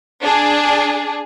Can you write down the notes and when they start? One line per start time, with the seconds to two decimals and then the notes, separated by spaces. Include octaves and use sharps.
0.22 D4 G#4